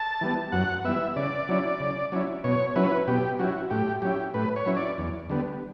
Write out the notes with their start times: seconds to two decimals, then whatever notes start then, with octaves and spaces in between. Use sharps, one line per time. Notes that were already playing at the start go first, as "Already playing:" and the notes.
Already playing: A5
0.21 E3 G3 B3
0.52 F#2 F#5
0.84 E3 G3 B3 E5
1.16 C#3 D5
1.49 F#3 C#4 E4
1.80 C#3
2.12 F#3 C#4 E4
2.44 B2 C#5
2.76 F#3 C#4 E4 B4
3.07 B2 G4
3.39 F#3 C#4 E4 F#4
3.70 A2 G4
4.02 F#3 C#4 E4 G4
4.34 A2 B4
4.56 C#5
4.65 F#3 C#4 E4
4.77 D5
4.98 E2
5.30 D3 G3 B3